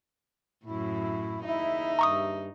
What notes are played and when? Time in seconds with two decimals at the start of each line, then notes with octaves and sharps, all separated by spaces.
0.66 F#2 A2 E4
1.45 D#2 C#3 D#4 E4 E5
1.99 G2 A#5 C#6 D#6